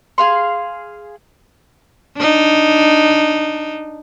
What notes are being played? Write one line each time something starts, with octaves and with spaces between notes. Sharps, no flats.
G#4 F5 C6
D4 D#4